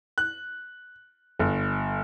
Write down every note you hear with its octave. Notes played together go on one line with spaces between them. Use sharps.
F#6
G1